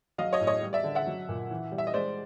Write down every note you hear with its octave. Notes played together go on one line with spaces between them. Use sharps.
F#3 D#5 F5
C#5 D#5
A2
C#5 D#5
G3
D5 E5
D3
E5 F#5
F#3
A#2
E3
G3
E5
D#5
G#3 C5 D5